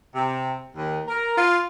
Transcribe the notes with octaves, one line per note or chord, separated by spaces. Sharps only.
C3
D#2
A#4
F4